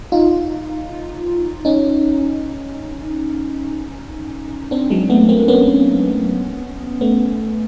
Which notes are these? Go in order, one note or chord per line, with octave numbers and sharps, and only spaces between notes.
D#4 F4
C#4 D#4
C4 D4
F#3 G#3
A3 B3
A#3 C4
B3 C#4
A3 B3